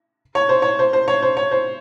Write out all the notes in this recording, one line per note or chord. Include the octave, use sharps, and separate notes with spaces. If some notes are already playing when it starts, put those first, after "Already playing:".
C#5
C5
C#5
C5
C5
C#5
C5
C#5
C5